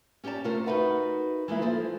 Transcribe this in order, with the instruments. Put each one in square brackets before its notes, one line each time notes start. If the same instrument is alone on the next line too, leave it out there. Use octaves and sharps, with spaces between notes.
[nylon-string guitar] C#4 G4 C#5 D5 A5
C3 A3 F4 A#4 C5
D#4 F#4 A#4 B4 E5 F#5
E3 G#3 A#3 E4
F3 A4 C5